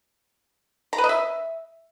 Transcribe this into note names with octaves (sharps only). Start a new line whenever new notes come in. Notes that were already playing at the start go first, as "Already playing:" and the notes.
A#5
B4
D#5
E5